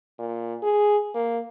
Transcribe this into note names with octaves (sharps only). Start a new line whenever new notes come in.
A#2
G#4
A#3